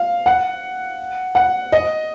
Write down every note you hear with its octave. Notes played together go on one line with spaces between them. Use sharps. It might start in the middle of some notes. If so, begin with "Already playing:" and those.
Already playing: F5
F#5
F#5
D#5